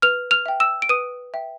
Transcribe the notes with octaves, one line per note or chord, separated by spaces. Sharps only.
B4 F6 F7
F6 F7
E5 G5
E6 E7
D7
B4 D#6 D#7
E5 G5